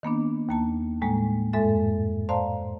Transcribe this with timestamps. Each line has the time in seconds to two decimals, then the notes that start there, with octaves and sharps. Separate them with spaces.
0.03 D#3 A#3 B3 D4
0.49 D#2 A#3 A5
1.02 A2 G3 G#3 A#3
1.53 F2 G#2 G#3 A4 E5 A6
2.29 C5 D5 F5 A5 A#5 C6